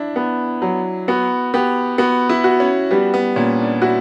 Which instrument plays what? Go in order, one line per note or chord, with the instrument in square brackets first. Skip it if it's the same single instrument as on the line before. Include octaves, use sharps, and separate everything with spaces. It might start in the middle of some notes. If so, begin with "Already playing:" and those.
Already playing: [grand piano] D4 E4
[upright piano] B3
F#3
[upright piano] B3 [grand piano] F#4
[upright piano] B3 [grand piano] G4
[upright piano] B3 [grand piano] F#4
[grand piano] E4
[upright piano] F#4
[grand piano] C#4
[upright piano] G3 [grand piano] B3
[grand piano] B3
[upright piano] A#2 [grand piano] C#4
[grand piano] D4
[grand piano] E4 [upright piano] F#4